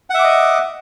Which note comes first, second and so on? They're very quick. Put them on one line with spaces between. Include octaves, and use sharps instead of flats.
F#5 E5 D6 D#5